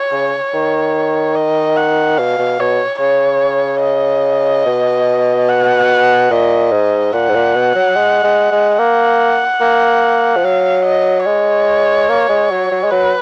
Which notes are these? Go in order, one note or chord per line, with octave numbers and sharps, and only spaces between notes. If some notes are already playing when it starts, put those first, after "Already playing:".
Already playing: C#5
C#3
D#3
D#5
F#5
B2 F5
B2
B2 C#5
C#3 C#5
D#5
B2
F#5
A#2 D#5
G#2
A#2 F#5
G#2
A#2
B2
F#3
G#3
G#3
G#3
A#3 F#5
A#3
F3
F#3 F5
D#5
G#3 C#5
A#3
G#3
F#3
F#3
G#3
F#3 B4